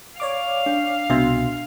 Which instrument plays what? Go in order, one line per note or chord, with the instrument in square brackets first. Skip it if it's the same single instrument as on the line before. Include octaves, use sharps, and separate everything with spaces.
[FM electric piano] C#5 D5 D6 [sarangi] F5
[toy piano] D4
[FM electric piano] C2 B2 C6 [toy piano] D4 E5 E6